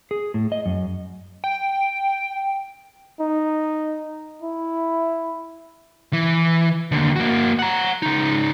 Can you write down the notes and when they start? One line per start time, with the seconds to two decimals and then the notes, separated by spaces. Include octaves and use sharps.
0.11 G#4
0.34 A2
0.52 D#5
0.66 F#2
1.44 G5
3.20 D#4
4.42 E4
6.13 E3
6.92 D#2 D3
7.16 A#3 F#4
7.59 F#5 A#5
8.02 C#3 D#4